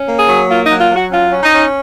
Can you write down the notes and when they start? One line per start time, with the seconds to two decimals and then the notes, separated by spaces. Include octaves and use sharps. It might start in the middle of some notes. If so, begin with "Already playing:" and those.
Already playing: C#4
0.08 A#3
0.19 G#4
0.28 F#3
0.50 A#3 F4
0.65 D#4
0.70 F#3
0.80 F4
0.91 F#3
0.96 F#4
1.11 C#4 F4
1.33 C#4
1.42 D#4
1.53 C#4